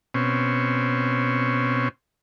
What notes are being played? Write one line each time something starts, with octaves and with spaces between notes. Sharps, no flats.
B2 C4 C#4